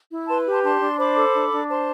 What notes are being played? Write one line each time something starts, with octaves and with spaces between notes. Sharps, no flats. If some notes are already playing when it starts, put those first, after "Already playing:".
E4
B4 A5 C6
G4
A5 C6
D4 A5 C6
D4
C5 B5 D6
A4
D4
D4
C5 A5 C6